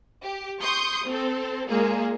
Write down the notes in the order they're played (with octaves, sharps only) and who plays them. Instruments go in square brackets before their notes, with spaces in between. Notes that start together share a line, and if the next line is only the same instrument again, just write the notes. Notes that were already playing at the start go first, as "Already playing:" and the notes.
[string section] G4
C6 C#6 D#6 G6
C4 A4
A#2 G#3 A#3 G#4